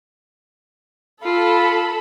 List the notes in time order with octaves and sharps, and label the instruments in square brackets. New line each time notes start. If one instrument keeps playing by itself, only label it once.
[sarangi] F4 [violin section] A4 B5